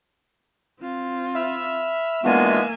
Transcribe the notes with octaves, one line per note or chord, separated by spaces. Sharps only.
C4 F4
E5 B5 E6 F6
E3 G#3 A#3 B3 D4 F4 F#4 G#5